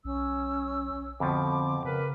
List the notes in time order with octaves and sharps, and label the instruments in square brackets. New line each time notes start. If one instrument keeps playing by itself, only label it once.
[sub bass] B1 [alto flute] C#4 [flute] E6
[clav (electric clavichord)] F2 B2 F3 [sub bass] D3 [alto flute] C4 [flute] D6
[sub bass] C#3 [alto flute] A#4 [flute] B4